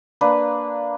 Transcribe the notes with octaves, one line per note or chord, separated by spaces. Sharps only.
A#3 D4 B4